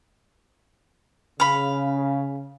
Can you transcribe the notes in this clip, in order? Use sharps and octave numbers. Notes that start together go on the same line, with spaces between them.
C#3 F5 B5